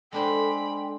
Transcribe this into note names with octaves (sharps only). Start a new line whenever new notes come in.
G#3 D4 A4 C5 G5 B5